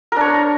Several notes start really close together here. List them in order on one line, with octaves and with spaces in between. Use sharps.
A#4 D4 C#5